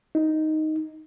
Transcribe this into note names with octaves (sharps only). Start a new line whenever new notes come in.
D#4